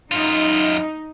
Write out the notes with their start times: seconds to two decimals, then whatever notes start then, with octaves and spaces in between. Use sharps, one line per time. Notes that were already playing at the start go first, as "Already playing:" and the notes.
0.11 F#2 D#4 F4